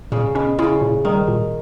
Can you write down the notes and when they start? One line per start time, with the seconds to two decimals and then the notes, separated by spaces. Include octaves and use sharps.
0.12 A#2 C#3
0.35 B2 C#4
0.59 C#3 E4
0.82 A#2
1.05 D#3 G3
1.28 A#2